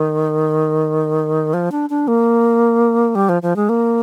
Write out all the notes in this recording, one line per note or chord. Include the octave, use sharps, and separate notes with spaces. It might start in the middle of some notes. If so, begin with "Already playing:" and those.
Already playing: D#3
F3
D4
D4
A#3
G3
F3
F3
G#3
A#3